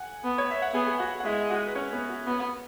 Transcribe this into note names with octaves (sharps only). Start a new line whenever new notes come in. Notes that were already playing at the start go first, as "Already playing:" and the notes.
Already playing: F#5 G#5
B3
C#5
E5
F#5
B3 G#4 G#5
G#4 G#5
F#4 F#5
F#5
G#3 E4 E5
F#4 F#5
B4
C#4 C#5
B3 B4
F#4
B3 F#4